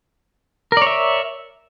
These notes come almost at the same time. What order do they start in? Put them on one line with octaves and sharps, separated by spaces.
A#4 D5 C#5 E5